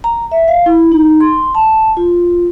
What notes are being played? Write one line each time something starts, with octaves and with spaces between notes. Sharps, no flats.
A#5
E5
F5
E4
D#4
C6
A5
F4